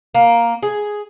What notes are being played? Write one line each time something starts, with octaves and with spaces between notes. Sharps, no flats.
A#3
G#4